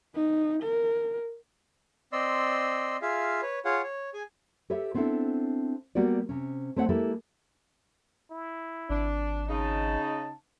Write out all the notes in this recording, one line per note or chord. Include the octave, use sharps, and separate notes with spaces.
D#4
A#4
C4 D5 D#5 C6 E6
F4 G#4 E5 F5
B4 C#5
F4 G#4 C#5 F5 F#5
C#5
G#4 G#5
G4 A4 B4 C#5 E5
B3 C4 D4 E4 A4
G3 A#3 B3 F#4 G4 D5
C3 C#4
A3 C4 C#5 F#5
G#3 A#3 E4 G4 A4
E4
G#1 D4
C#3 D#4 A5